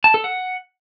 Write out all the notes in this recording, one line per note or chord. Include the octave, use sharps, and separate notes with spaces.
A5
A4
F#5